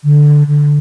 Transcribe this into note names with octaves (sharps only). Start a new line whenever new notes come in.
D3
D3